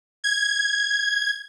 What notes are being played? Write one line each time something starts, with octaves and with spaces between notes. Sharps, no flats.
G#6